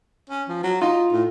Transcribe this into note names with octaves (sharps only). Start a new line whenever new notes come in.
C#4
F3
F#3
D#4 F4
A2